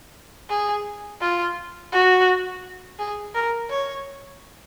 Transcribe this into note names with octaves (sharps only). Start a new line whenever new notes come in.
G#4
F4
F#4
G#4
A#4
C#5